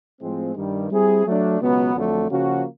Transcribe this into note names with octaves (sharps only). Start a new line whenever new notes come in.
A2 F3 G#3 C4
G2 D#3 G3
G3 C4 E4 G#4
F#3 A3 D4
C#2 B2 F#3 B3
F2 D3 F#3 A3
C#3 F3 A#3 C#4 F#4